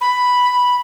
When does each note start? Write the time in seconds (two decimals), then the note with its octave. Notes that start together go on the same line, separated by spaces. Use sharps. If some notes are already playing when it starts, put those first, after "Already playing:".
0.01 B5